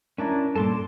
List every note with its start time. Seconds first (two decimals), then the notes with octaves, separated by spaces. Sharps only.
0.18 C#4 D4 E4 A#4 A5 A#5
0.56 G2 A#2 A4 A5 C6 D6